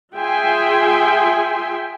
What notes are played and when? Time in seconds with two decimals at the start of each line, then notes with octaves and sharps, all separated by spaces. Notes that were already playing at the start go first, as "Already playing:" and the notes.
0.16 F4 G#4 E5 G5 G#5 C6